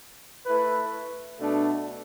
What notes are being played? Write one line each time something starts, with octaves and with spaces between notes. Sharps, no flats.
A3 E4 B4
B2 A3 D4